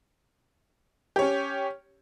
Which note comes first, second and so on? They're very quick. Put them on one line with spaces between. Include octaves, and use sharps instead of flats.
G4 C#5 C#4